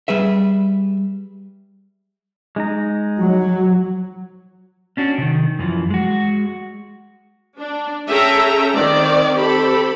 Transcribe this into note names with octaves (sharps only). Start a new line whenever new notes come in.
G3 G#4 B4 E5
G#3 D#4 A#5
F#3
C#4 D4 F#4
C3 D#3
F#2 E3 F3
G#3 F#4
D4
C#4 G#4 A4 E5 G5 A#5
D#3 C4 D5
C4 G4 A4 B5